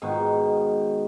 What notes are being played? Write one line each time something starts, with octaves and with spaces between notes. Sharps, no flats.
G#2 B2 D#3